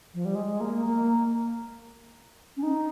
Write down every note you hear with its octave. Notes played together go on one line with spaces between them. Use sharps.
F3
G3
G#3
A#3
A#3
C#4
D#4